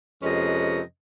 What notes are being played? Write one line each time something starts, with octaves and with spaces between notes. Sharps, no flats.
F2 C3 G#3 C#4 B4 D#5